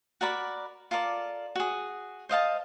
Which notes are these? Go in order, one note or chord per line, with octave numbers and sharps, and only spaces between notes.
F#4 A#4 D5 B5
F4 A4 A#4 D5
F#4 G#4
C5 D#5 F5 A5